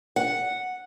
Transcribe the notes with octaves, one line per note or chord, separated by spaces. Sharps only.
F#5